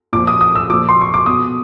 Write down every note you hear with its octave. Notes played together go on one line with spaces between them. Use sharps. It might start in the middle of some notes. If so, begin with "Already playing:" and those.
A#2 F3 D6
D#6
D#6
E6
A#2 F3 D6
C6
C#6
D6
B2 D#6